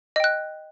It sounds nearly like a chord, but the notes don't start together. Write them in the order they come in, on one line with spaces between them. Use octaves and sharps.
D#5 G5 F#6